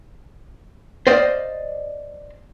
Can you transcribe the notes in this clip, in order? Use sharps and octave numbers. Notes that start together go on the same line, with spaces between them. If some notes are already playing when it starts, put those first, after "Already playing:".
C5 D5 D#5 F5